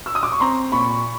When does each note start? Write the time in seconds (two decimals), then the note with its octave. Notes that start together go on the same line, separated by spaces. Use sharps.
0.06 E6
0.15 D#6
0.23 D6
0.32 C#6
0.40 C4 A#5 C6
0.72 A#2 B5 C#6